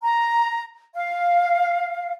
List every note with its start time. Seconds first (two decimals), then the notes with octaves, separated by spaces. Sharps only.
0.02 A#5
0.94 F5